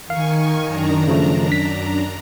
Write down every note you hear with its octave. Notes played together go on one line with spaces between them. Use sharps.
D#3 F5 G#5 C#6
F#2 D4 A#5
C#3 F3 A3
B6